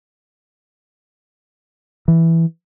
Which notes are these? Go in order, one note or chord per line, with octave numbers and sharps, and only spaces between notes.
E3